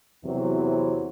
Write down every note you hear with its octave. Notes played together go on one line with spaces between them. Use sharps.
E2 C3 E3 F#3 C4